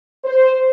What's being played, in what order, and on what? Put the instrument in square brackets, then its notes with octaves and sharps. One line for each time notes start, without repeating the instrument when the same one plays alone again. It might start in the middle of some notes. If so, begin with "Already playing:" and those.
[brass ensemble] C5